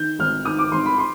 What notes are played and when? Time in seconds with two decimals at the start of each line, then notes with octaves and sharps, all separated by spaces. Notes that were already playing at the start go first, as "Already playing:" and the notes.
Already playing: D#3 G6
0.19 G#1 F6
0.45 D#3 D#6
0.59 D6
0.72 G#1 C6
0.86 B5
0.98 C6